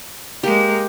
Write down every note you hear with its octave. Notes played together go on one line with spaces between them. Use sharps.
G#3 A#3 G4